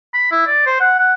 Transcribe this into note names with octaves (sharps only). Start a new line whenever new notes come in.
B5
E4
D5
C5
F#5
F#5